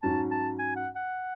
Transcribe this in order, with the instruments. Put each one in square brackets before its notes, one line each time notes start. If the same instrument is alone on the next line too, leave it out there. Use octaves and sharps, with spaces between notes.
[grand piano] G#2 F#3 C#4 [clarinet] A5
[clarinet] A5
G#5
F#5
F#5